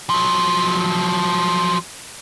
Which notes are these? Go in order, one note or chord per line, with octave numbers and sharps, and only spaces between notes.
F3 F#3